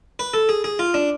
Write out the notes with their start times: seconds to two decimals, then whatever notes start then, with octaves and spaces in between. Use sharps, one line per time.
0.19 B4
0.34 A4
0.49 G#4
0.64 G#4
0.79 F4
0.94 D4